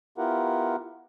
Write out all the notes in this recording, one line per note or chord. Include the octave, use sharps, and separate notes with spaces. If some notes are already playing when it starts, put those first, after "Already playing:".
B3 E4 F4 G4 A#4 F#5